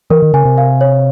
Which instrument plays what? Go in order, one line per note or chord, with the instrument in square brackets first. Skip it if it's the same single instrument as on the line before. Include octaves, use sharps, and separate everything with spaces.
[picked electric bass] E3 [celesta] A#4
[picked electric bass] D#3
[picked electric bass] C#3 [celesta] G#5
[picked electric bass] C3
[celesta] F5
C#5